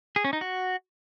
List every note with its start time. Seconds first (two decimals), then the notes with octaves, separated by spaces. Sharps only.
0.16 G#4
0.24 C#4
0.33 D#4
0.41 F#4